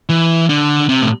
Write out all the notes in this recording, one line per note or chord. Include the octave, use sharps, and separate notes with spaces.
E3
D3
C3
A2